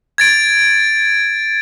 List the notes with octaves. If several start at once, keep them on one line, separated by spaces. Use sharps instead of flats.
G#6 A6 D7